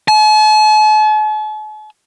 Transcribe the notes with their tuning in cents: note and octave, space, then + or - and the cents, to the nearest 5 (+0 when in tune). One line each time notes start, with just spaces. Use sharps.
A5 -45